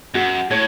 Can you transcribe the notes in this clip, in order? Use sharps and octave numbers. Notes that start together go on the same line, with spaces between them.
F#2 F#4
A2 C#5